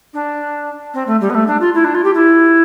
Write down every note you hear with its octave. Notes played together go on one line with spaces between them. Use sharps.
D4
C4
A3
G3
B3
A3
D4
F4
E4
D4
F4
G4
E4